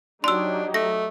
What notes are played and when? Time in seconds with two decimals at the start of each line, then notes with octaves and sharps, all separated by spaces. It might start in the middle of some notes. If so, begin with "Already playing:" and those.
0.24 F#3 D4 D#4 G4 C6 E6
0.74 A3 A#6